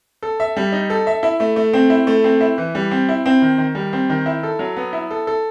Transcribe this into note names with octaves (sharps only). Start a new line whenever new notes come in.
A4
E5
G3
D#4
A4
E5
E4
A3
A3
C4
E4
A3
C4
E4
E3
G3
C4
E4
C4
D#3
D#3
G3
C4
D#3
E4
A4
F#3
B3
E4
A4
A4